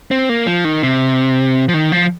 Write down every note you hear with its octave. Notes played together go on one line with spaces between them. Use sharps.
C4
A#3
F3
D#3
C3
F3
D#3
F3